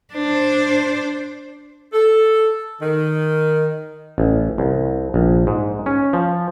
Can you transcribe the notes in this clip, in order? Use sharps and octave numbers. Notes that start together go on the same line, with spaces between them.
D4 C5
A4
D#3
A1
C2
A#1
G#2
C#4
F3